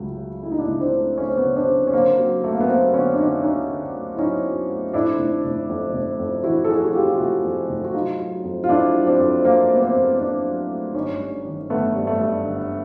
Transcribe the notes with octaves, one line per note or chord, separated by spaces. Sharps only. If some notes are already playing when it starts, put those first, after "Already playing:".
Already playing: C#2 C#3 F#3 A3
F#3
A3 E4
D#4
D4 E4
C#2
C4 D4
A3
A3 C#4
C4
B3 C#4
C#3
C4 D4
C#3
C#4
D3 A#3 C4
F#3
A3
A#3
B3
F#3 A#3 C4
D3 B3 C#4
D4
D3 C#4 D#4
D2 C#4 D#4
D3
A3
E4
F#3 C#4 D#4
F#3
A3
F2 D4 E4
F1
F1
F2
F1
F2
E3 E4 F#4
A4
F2 F#4 G#4
F#4
F2 F4 G4
F4
F1 E4 F#4
F2
F1
F#4
F#3 D#4 F4
F#3
F2
F4
F2 D4 E4
F#3
C4 D4
F2
F2 A#3 C4
A3
B3
A#3 C4
F2
F2 C4 D4
F#3
A3
G1 C#4 D#4
G2
D#3
G1 A3 B3
G2
A3
G2
G1